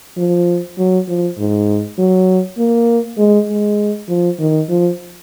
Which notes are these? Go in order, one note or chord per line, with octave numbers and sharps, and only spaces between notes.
F3
F#3
F3
G#2
F#3
A#3
G#3
G#3
F3
D#3
F3